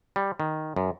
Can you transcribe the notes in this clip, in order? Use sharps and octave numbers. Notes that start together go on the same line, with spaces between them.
G3
D#3
F#2